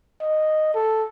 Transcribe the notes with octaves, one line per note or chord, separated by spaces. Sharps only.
D#5
A4